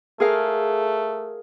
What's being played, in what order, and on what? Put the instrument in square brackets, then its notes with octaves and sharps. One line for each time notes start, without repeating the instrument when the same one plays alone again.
[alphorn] A3 [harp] G#4 A#4 F5